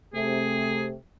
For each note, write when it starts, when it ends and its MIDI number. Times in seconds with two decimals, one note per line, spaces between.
0.14 0.94 48
0.14 0.94 57
0.14 0.85 68